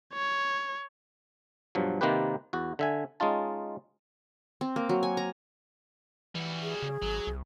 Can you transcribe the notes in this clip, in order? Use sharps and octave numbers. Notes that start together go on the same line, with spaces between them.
C#5
G2 B2 F3 F#3
C3 D#3 A#3 C4 G4 B4
E2 F#4
D3 E5 G#5
G#3 C#4 D#4 F4 A5
C4
A#3
F#3
G#5
A#5
E3 G3 F#4
G#4
C#3
G#1 F#3
C2